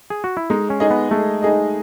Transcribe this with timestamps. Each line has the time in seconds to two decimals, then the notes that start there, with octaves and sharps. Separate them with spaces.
0.10 G#4
0.24 F#4
0.37 E4
0.50 G#3 D#4
0.70 C#4
0.80 D#4 G#4 D#5
0.91 B3
1.11 G#3 A3
1.42 D#4 G#4 D#5